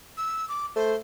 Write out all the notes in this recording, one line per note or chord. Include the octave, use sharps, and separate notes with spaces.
E6
D6
A3 C5